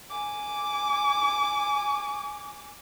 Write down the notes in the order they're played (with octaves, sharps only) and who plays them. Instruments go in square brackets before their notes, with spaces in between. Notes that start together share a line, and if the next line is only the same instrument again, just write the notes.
[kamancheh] G#5 D6